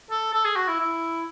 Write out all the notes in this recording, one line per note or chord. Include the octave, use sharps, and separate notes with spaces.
A4
A4
G#4
F#4
E4
E4